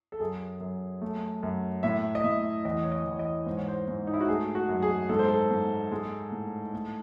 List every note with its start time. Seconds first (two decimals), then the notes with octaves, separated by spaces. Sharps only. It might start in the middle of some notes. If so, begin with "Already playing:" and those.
0.12 A4
0.20 F#2 G#4
0.61 F#2
1.01 A3
1.43 F#2
1.83 A2 E5
2.15 D#5
2.24 A2 E5
2.65 E2 D#5
2.83 C#5
2.92 D#5
3.06 E2
3.13 C#5
3.19 D#5
3.46 G#2 C5
3.57 C#5
3.68 C5
3.88 G#2
4.07 D#4
4.14 E4
4.21 F#4
4.28 A3 G#4
4.55 F#4
4.69 F#2
4.82 G#4
5.09 G#2 A4
5.19 C5
5.28 A4
5.51 G#2
5.91 G#3
6.32 A2
6.73 A3